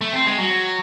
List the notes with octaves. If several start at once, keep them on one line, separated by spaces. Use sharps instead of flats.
A3
C4
G#3
F#3